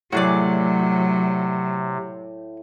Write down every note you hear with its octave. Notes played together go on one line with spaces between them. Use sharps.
A2 C3 F#3 F#4 G#4 D5